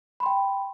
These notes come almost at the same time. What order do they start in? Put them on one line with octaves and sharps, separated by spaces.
B5 C6 G5